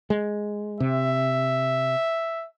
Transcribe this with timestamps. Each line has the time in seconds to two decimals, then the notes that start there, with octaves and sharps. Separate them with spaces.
0.10 G#3
0.80 C3 E5